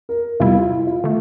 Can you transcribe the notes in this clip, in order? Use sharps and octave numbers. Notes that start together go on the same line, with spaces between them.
A#4
E2 C3 G3 C4 E4 F4
F4
E4
F4
D3 A3